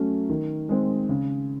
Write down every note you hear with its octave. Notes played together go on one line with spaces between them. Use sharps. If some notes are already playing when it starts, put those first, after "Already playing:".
Already playing: F#3 A3 C#4
D#3
G#3 C4
C#3